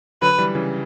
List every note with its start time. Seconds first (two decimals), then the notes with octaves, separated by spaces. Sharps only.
0.22 D3 F#3 B4
0.38 E3 G3
0.55 C#3 E3